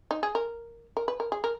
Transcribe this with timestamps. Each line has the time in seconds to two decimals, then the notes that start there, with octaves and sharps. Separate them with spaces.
0.11 D#4
0.23 G#4
0.35 A#4
0.97 A#4
1.08 B4
1.20 A#4
1.32 G#4
1.44 A#4